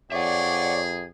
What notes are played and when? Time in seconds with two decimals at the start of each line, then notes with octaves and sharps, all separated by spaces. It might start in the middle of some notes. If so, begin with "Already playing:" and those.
0.12 F2 G#4 C#5 D5 E5 F#5